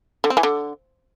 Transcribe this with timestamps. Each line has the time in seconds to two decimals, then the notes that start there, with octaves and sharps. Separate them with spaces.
0.24 D3
0.30 C4
0.37 E3
0.43 D3